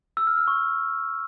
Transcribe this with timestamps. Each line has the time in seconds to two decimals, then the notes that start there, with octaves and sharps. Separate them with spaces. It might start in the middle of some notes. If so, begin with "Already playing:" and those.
0.17 E6
0.27 F6
0.37 F6
0.47 C#6